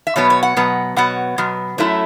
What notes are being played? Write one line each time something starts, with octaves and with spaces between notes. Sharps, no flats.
E5
B2 F#3 B3 C#5
C#5
F#5
B2 F#3 B3
B2 F#3 B3 F#5
B2 F#3 B3
F#2 F#3 A3 E4